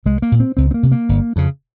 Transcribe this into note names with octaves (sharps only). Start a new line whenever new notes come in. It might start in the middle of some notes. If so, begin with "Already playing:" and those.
C2 G#3
A#3
A#2
C4
C#2 C4
C4
A#3
C3
A#3
G1
F2 C#3